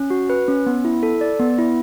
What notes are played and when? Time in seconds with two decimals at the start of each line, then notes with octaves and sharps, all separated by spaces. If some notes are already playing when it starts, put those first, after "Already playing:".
Already playing: C#4
0.10 F#4
0.30 B4
0.48 C#4
0.66 B3
0.85 E4
1.03 A4
1.21 D5
1.39 B3
1.58 E4